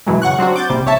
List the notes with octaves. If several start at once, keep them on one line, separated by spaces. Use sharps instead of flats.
F#2 B2 E3 F#3 G#3
C#3 F#5 C#6 F#6
F#3 C4 D4 F#4
D6 G6 A6
A#1 C3 G3
A#1 C#5 E5 A5